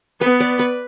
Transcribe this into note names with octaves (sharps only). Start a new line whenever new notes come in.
B3 B4
D5
B4